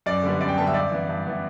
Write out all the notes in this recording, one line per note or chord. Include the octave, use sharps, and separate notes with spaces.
F#2 D5
D3 G3 B3
F#2 D5
G5
D3 G3 B3 A5
E5
G2 D5
E3 B3
G2
E3 B3